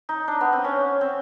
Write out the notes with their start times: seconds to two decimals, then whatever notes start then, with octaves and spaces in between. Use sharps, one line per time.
0.09 D#4
0.28 D4
0.41 B3
0.53 C4
0.64 C#4
1.01 C4